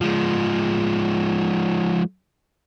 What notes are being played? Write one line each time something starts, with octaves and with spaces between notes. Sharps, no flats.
F3 G#3